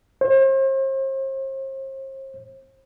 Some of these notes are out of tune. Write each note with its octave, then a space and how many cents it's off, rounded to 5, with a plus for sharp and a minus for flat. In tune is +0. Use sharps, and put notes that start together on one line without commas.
C5 +40